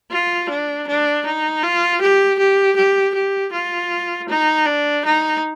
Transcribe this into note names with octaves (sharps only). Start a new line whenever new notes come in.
F4
D4
D4
D#4
F4
G4
G4
G4
G4
F4
D#4
D4
D#4